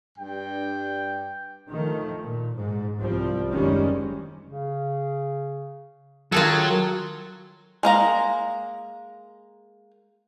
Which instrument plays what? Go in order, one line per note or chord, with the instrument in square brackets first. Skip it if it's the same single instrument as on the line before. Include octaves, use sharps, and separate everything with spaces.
[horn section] G2 G5
[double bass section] D#3 F3 A3
A#2
G#2
C2 F3 G3 C4
F#1 D#2 D#3 G3 G#3 C#4
[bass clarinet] C#3
[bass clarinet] D#3 [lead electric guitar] F#3 [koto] F4 G#4 A4
[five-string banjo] G#3 A#3 A#5